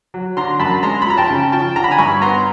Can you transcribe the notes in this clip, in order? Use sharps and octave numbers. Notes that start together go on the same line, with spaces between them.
F#3
D3 A#5 C6
F#2 A5 B5
G#3 A#5 C6
B5
F3 A#5
G5 A5
C#3
F3 G5 A5
D3 A#5
B5
G#5 A#5
G2 B5 C#6
B3 A#5 C6